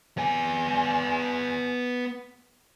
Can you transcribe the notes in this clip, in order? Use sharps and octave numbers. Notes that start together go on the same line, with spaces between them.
B3 G#5